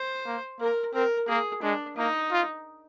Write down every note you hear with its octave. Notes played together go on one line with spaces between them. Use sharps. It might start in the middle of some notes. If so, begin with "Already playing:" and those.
Already playing: C5
A#3
A#3 A#4
C4 A#4
A#3 G#4
G#3 D4
A#3 D#4
F4